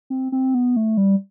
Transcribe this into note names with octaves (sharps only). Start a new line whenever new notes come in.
C4
C4
B3
A3
G3